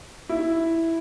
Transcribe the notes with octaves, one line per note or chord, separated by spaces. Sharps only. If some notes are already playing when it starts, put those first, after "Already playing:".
E4